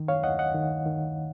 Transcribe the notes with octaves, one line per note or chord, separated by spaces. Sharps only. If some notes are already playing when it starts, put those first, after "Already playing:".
Already playing: D#3
C#5 F5
D#2 D#5 F#5
D#5 F#5
D#3
D#3